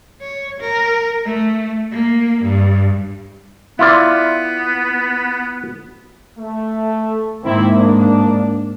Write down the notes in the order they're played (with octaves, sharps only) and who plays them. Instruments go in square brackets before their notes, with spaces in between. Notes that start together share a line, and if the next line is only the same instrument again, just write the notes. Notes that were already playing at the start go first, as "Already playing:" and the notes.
[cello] C#5
A#4
A3
A#3
G2
[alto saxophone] B3 [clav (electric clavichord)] E4 F4 D5
[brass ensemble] A3
[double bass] G#2 A#3 [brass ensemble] D#3 C4 E4
[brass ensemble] D4